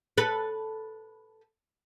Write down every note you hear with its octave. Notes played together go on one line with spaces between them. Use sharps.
A4 B4